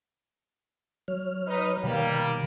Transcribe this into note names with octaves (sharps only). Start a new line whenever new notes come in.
F#3 C#5 F6
D#4 B4 D#5
B2 D#3 G3 A#3